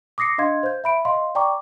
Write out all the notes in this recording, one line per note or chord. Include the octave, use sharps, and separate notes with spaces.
D6 D#6 A#6 C7 C#7
D4 D#5 F5 C6 G#6
C5 G6
E5 B5 D7
D#5 F5 C6
D5 G5 A#5 C#6 D6